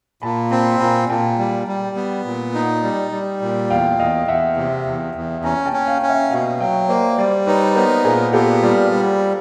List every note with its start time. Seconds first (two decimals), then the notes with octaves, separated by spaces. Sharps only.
0.22 A#2 A5 B5
0.51 C4 A5 B5
0.71 B5
0.80 A#2 G#5 A#5
1.09 A#2 G5 A5
1.38 G3
1.68 G3
1.96 B3
2.25 A#2
2.54 D#4
2.83 G3
3.12 G3
3.42 A#2
3.70 E2 F5 G5
3.99 E2 D#5 F5
4.28 E2 E5 F#5
4.57 C3
4.86 E2
5.15 E2
5.44 C#4 G#5 A#5
5.66 G5 A5
5.73 C#4
5.88 F5 G5
6.02 C#4
6.09 E5 F#5
6.31 B2 D#5 F5
6.60 F#3 F5 G5
6.88 A#3 C5 D5
7.17 G3 C5 D5
7.47 D#4 B4 C#5
7.75 B3 A#4 C5
8.05 A#2 G#4 A#4
8.33 B3 G4 A4
8.62 G3 F4 G4
8.92 G3